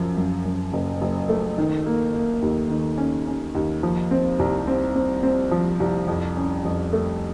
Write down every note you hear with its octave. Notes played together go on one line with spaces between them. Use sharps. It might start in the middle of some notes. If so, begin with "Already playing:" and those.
Already playing: F#2 F3
F#2
F#2
F#1
F#1
A3
D#3
A#3
A#3
D#2
D#3
C#4
C#4
D#2
F3
C4
C2
C4
C4
C4
F3
C2
F2
C#4
F2
A3